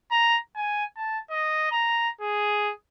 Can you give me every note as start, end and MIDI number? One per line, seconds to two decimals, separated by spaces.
0.11 0.38 82
0.56 0.85 80
0.97 1.19 81
1.30 1.70 75
1.71 2.09 82
2.21 2.72 68